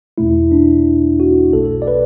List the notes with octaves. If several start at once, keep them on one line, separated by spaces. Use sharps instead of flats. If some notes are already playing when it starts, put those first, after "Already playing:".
E2 B2 A3 E4
D4
F#4
B1 B2 A3 A4
D5
B4